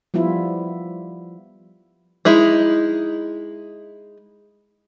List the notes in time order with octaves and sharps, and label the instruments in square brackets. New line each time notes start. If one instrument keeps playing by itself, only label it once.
[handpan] F3 G3 B3 E4 F4
[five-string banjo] G#3 D#4 E4